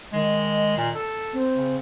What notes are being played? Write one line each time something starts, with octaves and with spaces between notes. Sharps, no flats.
D#3 G#3
A#2
A4
C4
C#3